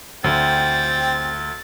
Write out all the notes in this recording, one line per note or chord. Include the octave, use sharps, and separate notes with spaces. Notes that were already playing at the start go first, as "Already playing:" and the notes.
D2 C4 G5 A6